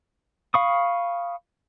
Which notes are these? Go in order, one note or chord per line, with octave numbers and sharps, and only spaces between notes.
F5 B5 C#6 D#6